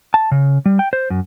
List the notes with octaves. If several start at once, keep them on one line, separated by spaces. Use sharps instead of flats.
A5
C#3
G3
G5
C5
F#2